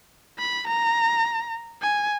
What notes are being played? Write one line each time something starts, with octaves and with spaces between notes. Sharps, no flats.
B5
A#5
G#5